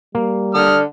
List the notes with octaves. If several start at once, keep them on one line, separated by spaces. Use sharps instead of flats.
G3 A#3
D3 D#6 F6